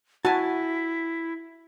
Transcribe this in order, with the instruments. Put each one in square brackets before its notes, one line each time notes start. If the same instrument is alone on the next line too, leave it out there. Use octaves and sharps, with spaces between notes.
[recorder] E4 [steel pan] F#4 [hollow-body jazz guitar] G#5 A5